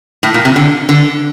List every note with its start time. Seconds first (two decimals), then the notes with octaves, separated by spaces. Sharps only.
0.23 A2
0.34 A#2
0.45 C3
0.56 D3
0.89 D3